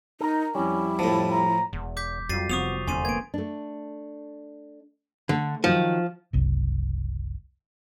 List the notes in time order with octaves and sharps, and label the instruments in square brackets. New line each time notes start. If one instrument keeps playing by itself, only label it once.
[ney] D#4 [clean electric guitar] A4 A#4
[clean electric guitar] F2 G3 [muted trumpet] C#4 [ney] E4
[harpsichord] A2 F3 [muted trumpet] A5
[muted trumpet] A#5
[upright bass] E1 [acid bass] E2
[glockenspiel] D6 G6 B6
[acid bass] F2 [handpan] F#3 G3 F4 [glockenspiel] A6 C7 D#7
[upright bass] F1 [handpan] F3 C4 [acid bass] B3 [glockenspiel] C#6 D#6 F7
[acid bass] E2 [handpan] D3 A3 C4 [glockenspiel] G#5 C6 D#7
[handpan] A#3 B3 B4 [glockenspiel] G#6 D7
[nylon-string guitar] A3 D4
[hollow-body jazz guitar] D3 [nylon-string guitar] A3
[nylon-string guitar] D#3 F#3 [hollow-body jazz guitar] F3
[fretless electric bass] F#1 C2